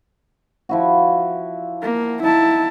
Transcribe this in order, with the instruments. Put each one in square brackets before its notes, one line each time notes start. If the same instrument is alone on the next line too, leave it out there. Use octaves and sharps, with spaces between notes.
[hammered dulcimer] F3 E4 F#4
[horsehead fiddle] A#3
[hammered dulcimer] D#4 [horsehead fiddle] E4 A5